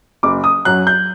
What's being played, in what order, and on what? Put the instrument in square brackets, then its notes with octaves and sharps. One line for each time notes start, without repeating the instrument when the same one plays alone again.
[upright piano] F#1 D6
D#6
F#2 F#3 F#6
G6